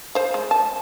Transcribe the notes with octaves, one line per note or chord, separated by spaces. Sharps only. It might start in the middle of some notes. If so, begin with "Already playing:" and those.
C5 F5
G#3
A5